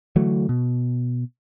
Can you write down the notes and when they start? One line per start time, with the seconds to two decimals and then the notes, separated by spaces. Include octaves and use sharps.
0.16 D3 E3 F#3 A3
0.49 B2